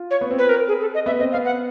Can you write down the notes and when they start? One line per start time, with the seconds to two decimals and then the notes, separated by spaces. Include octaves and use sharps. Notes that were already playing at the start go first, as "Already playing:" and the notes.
Already playing: F4
0.11 C#5
0.21 B3
0.31 C4
0.38 B4
0.49 A#4
0.68 G#4
0.81 A4
0.94 D#5
1.06 B3 E5
1.19 C4 D#5
1.32 B3 F5
1.45 F#5